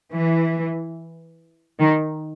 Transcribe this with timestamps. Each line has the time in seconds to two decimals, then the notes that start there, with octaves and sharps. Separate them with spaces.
0.13 E3
1.80 D#3